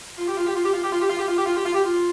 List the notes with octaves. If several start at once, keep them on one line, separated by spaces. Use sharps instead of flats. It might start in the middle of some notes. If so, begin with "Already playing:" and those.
F4
G4
F4
G4
F4
G4
F4
G4
F4
G4
F4
G4
F4
G4
F4
G4
F4
G4
F4